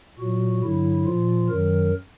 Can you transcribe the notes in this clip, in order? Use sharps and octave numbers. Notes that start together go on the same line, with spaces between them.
A#2 F#3 F#4
G2 D3 F#3 E4
A#2 F3 F4
F#2 D#3 F#3 A#4